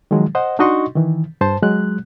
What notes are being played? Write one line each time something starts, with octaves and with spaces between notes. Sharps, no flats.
D#3 F3 F#3 G#3
C5 D#5 F#5
D4 D#4 F#4 D#5 C6 C#6
D#3 E3
G2 C5 A5
F#3 G#3 F#6